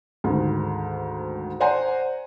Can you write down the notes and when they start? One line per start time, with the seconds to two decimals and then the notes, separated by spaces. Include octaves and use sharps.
0.24 D2 G#2 D#3
1.60 C5 D5 F#5 G#5 A#5 C6